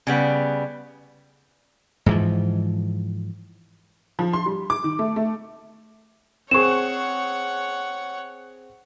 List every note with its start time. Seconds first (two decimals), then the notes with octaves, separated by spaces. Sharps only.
0.07 C#3 G3 B3
2.06 G#2 E3 F3
4.19 F3
4.33 C6
4.46 G3
4.70 D6
4.84 D#3
4.99 A3
5.16 A3
6.51 C4 G#4 C#5 F#5 C#6 E7